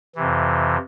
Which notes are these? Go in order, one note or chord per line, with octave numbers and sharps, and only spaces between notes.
F2 C3 E3